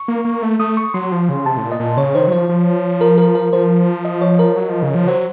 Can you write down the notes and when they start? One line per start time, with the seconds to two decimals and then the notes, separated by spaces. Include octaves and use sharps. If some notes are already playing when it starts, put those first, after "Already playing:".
Already playing: C#6
0.08 A#3
0.25 A#3
0.43 A3
0.59 A3 D#6
0.77 C#6
0.94 F#3 C6
1.12 F3
1.29 C#3
1.46 C3 A5
1.57 A2
1.63 A#2
1.72 D#5
1.80 A#2
1.97 C#3 C#5
2.15 D#3 C5
2.27 F#3
2.32 F3 C5
2.49 F3
3.01 A#4
3.18 A#4
3.35 A#4
3.53 F3 C5
4.05 D#5
4.21 C#5
4.39 A#4
4.57 F#3
4.69 F3
4.83 C#3
4.95 F3
5.07 F#3 C5